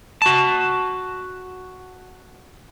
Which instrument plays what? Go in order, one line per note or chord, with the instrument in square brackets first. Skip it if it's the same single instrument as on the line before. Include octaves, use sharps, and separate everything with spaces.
[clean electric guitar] F#4 A5